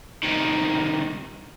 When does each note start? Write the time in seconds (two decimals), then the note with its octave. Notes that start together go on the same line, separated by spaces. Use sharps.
0.23 C2 D#3